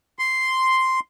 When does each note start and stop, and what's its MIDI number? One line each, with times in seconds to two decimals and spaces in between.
0.19 1.00 84